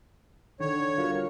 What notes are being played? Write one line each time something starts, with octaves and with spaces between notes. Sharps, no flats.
D3 D#3 C#5
G3 F4 F#4 A#4 F5